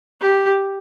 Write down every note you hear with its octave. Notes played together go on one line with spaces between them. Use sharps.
G4